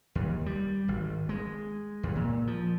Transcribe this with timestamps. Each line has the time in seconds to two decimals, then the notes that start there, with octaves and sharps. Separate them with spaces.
0.15 D#2
0.46 G3
0.88 G#1
1.29 G#3
2.03 D#2
2.15 A#2
2.47 F3